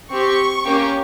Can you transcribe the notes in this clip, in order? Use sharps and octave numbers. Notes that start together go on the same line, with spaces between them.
C4 G4 C#6
A#3 C#4 G4